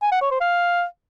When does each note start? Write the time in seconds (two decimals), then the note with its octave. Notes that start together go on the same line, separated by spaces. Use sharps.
0.02 G#5
0.12 F#5
0.22 C#5
0.31 C5
0.41 F5